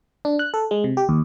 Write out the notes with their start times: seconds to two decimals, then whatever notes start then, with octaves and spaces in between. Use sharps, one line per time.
0.25 D4
0.39 F#6
0.54 A4
0.71 G#3
0.84 C3
0.97 G4
1.09 D#2